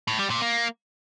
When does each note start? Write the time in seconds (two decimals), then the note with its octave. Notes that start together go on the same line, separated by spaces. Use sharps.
0.08 A2
0.19 G3
0.30 A#2
0.42 A#3